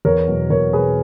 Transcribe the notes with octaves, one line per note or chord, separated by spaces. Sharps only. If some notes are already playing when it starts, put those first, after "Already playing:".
E2 A#4 C#5
B2 F#3
E2 A#4 C#5
B2 F#3 G#4 B4